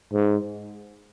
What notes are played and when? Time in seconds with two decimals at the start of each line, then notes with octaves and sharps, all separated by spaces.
0.13 G#2